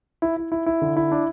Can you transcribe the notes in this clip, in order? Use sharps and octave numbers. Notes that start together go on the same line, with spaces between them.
E4
E4
E4
E4
D3
E4
D4